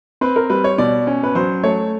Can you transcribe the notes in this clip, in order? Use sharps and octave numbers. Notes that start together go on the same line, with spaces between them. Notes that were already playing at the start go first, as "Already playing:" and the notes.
C4 B4
A#4
G3 B4
C#5
B2 D5
C#4
B4
F#3 C5
A3 C#5